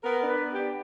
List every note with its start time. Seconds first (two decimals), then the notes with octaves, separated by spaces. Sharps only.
0.03 B3 A#4
0.22 D4
0.28 B4
0.40 B3
0.52 G4
0.58 D4